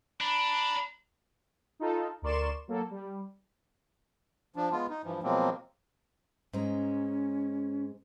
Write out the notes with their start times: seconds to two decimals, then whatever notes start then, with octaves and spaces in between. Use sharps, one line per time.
0.20 D4 A#5 B5
1.80 D#4 F4 A4
2.22 D2 A#4 D5 C6 C#6 E7
2.68 F#3 A#3 A4
2.91 G3
4.56 F3 D4
4.72 G#3 B3 F4
4.90 D#4
5.04 G2 E3 F3
5.23 B2 F3 F#3 G#3 A#3 C4
6.53 G#2 G#3 C#4 A#5